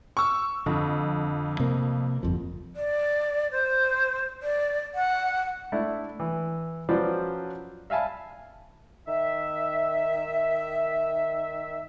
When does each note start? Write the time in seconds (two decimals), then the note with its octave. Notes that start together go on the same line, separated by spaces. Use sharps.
0.17 C#6 E6
0.66 F2 D3
1.60 C3 A#3
2.23 G1 F2 F3
2.76 D5
3.52 C5
4.42 D5
4.95 F#5
5.72 A3 D4 E4
6.20 E3
6.89 F3 F#3 C#4 B4 C5 D5
7.90 E5 F5 G#5 A5 B5
9.07 D#3 E5